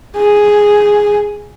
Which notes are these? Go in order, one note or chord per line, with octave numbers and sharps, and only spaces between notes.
G#4